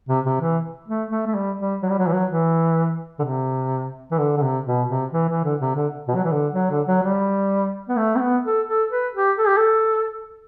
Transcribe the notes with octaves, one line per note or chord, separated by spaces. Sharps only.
C3
C3
E3
A3
A3
A3
G3
G3
F#3
G3
F#3
E3
F#3
E3
D3
C3
E3
D3
D3
C3
B2
C3
E3
E3
D3
C3
D3
B2
F#3
E3
D3
F#3
D3
F#3
G3
B3
A3
C4
B3
A4
A4
B4
G4
A4
G4
A4